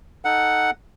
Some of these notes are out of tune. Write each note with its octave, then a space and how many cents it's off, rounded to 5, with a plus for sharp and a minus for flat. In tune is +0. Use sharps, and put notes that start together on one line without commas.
D#4 +0 A4 +0 F#5 +0